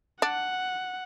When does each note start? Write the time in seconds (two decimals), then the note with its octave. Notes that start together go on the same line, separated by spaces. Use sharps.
0.22 D4 F#5